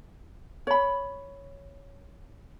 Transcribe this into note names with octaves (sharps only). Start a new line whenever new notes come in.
C#5 B5